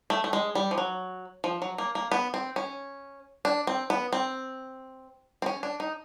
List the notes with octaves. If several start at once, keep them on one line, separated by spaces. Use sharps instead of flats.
A3
A3
G#3
G3
F3
F#3
F3
F#3
A#3
A#3
B3
C4
C#4
D4
C4
B3
C4
C4
C#4
D4
D#4